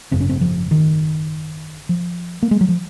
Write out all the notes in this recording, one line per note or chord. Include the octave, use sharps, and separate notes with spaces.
G#1 F#2 C#3 C4
C#4
C4
F3
D#3
F3
A#3
G#3
F#3
F3